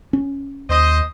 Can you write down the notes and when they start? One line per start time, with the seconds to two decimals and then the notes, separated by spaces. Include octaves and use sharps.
0.13 C#4
0.69 D#2 C5 D#5